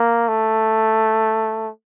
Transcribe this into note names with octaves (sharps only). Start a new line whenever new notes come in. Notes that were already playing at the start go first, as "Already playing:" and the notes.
Already playing: A#3
A3